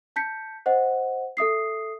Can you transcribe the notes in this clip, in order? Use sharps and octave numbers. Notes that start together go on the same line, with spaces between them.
A5 G6 B6 C#7
C5 D#5 F#5
A4 E5 D#6 C7